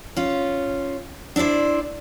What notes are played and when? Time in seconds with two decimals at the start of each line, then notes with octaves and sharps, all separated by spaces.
0.17 C#4 F4
1.36 D4 E4 B4 C5 D5